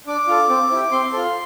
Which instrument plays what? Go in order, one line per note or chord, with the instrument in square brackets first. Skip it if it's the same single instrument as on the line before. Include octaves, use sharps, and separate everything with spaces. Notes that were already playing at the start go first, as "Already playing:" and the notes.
[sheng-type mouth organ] D4 D6
F4 A4
C4
E4 G4
C4 C6
F4 A4